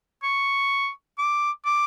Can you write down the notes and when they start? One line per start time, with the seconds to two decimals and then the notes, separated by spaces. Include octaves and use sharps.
0.23 C#6
1.18 D6
1.65 D6